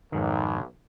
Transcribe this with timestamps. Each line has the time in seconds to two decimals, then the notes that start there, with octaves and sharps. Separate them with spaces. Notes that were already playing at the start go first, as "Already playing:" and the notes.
0.12 B1 F2 G#2 D#3